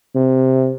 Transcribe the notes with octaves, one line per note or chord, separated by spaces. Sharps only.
C3